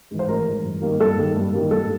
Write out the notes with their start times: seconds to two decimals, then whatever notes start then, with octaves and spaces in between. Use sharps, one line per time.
0.11 G#2 E3
0.19 C5
0.28 A1 A#4
0.47 G#2 E3
0.65 G2
0.82 D#3 G3 A#3
1.00 G2 A4
1.18 D#3 G3 A#3
1.36 G2
1.53 D#3 G3 A#3
1.71 G2 A4